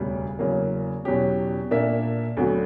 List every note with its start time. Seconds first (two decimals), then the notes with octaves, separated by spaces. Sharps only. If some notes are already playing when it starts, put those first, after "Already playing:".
Already playing: E1 D2 C#3 G3
0.39 E2 C#3 F#3 A#3
1.05 E2 B2 F#3 C#4 G4
1.71 A#2 A#3 D4 A#4 E5
2.37 D2 D3 F#3 B3 F#4